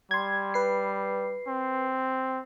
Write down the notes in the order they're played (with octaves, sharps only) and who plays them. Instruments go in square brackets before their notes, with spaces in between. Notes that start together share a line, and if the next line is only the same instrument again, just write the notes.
[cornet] G3 [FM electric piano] C6 G#6
[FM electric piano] B4 C7
[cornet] C4